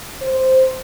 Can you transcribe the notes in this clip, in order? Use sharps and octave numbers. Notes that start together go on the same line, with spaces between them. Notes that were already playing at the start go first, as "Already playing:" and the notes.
C5